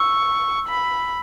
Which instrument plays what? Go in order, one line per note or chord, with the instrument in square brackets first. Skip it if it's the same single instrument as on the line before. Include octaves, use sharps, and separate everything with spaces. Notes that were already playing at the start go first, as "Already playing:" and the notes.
Already playing: [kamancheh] C#6 [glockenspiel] E6
[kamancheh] B5